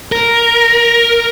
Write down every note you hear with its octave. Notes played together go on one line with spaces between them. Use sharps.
A#4